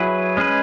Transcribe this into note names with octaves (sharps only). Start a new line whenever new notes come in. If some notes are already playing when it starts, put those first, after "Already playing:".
Already playing: F#3 E4 G#4 B4
G#3 C#4 G#4 B4